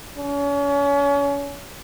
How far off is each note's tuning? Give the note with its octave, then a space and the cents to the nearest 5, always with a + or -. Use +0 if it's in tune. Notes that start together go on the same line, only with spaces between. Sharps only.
C#4 +35